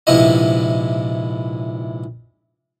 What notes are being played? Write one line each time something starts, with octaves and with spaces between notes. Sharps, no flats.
A#1 G#2 C3 B3 E4 D#5